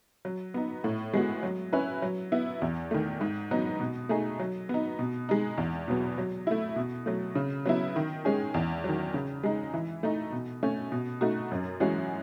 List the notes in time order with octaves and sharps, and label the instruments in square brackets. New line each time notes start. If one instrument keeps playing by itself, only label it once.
[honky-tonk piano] F#3
B3 D#4
A2
G#3 B3 F#4
F#3
C#4 E4 B4
F#3
B3 E4
E2
D#3 A3
G#2
F#3 B3 D#4
B2
A3 D#4 G#4
F#3
B3 D#4
B2
G#3 D#4
E2
B2 F#3 B3
F#3
A3 E4
B2
F#3 A3
C#3
F#3 B3 E4
D#3
G#3 C#4 G#4
E2
D#3 F#3
C#3
G#3 D#4
E3
A3 D#4
B2
A3 C#4
B2
A3 D#4 F#4
F#2
E3 G#3 C#4 F#4